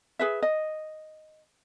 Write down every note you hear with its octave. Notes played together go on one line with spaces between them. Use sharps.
G#4 B4 E5
D#5